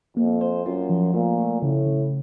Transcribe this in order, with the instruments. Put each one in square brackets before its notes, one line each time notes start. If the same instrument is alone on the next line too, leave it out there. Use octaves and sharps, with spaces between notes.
[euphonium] F2 [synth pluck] A#3
[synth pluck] C5
[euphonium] F#2 [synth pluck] F4
[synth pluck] F3
[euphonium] A#2 [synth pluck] A3
[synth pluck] A3
[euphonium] A2 [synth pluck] C#3
[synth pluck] C#3